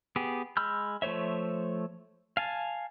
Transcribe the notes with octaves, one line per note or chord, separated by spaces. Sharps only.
B3 G4 G#4
G#3 B5 E6 F6 G6
F3 A3 C5 C#5 E5
F5 G#5 A5